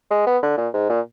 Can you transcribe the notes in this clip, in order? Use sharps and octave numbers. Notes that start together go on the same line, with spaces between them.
G#3
B3
D3
A#2
G#2
A#2